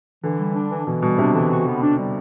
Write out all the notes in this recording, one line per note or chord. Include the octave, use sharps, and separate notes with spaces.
D3 E3
G3
D4
E3
B2 E3
B2 G3
C3 D4
D3 E3
F#4
B3
D4
G3